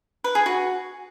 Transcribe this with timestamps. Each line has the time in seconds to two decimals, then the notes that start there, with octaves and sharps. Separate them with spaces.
0.24 B4
0.35 G#4
0.46 F#4